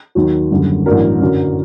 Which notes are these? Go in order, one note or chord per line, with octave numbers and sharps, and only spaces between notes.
D#2 D#3 F#3
F#1 F#2 D3 G3
A1 G2 F#3 A#4
F#2 D3 F#3